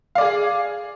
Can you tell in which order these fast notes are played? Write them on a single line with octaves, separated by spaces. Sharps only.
F5 D5 G#4